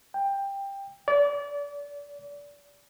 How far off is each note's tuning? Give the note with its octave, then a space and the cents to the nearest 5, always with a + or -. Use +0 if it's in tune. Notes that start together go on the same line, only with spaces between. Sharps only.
G5 +15
D5 -30